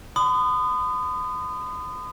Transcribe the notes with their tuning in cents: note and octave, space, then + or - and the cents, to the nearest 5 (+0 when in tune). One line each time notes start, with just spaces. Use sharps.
B5 +45 D#6 -20